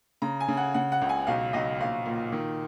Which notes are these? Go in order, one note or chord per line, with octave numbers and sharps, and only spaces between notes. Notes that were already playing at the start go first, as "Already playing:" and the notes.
C#3 A#5
G#5
C#3
F#5
C#3 F#5
F#5
C#2
G#5
B1 F5
B1 D#5
A#1 F5
A#2
D#3